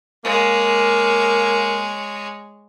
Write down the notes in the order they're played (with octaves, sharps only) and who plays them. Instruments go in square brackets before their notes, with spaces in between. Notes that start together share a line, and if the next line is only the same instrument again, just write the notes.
[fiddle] G#3 C#5 [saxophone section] A#3